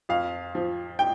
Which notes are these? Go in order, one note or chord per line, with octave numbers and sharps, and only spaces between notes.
F2 F5
F3
G5